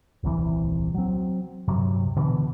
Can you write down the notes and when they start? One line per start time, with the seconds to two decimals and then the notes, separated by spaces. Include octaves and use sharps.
0.23 D#1 C2 C3 E3
0.94 F#3 C4
1.68 D2 G2 C3 F#3
2.16 B2 D3 E3